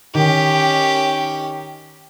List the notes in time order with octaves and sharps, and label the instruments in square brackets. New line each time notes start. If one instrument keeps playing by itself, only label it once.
[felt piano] D#3 [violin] C#4 G4